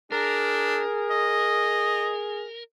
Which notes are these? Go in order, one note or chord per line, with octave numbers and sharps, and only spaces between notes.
D4 G#4 A#4
D#5